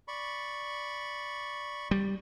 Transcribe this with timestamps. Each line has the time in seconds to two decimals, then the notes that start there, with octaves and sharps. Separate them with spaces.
0.08 D5 B5 C#6
1.91 G3